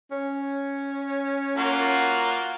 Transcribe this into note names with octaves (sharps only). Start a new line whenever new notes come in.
C#4
A#3 F4 F#4